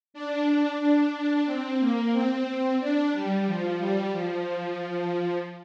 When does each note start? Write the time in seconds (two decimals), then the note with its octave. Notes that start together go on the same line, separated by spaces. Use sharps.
0.14 D4
0.80 D4
1.13 D4
1.46 C4
1.80 A#3
2.13 C4
2.80 D4
3.14 G3
3.47 F3
3.79 G3
4.13 F3